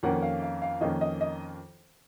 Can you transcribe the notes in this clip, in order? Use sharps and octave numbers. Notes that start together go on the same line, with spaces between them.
F2 D#3 A#3 C#4 F#5
F5
F5
F5
F2 D#3 A#3 C#4 D#5
D#5
D#5